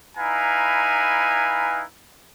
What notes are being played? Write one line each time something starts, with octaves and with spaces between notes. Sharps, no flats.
D#4 E4 B4 F5 G#5 A#5